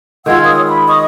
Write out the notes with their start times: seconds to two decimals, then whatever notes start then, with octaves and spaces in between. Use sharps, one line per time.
0.26 D#3 G#3 F4 F#5 E6 G#6
0.44 C#5 D#6
0.67 B5
0.88 D#5 C#6 D#6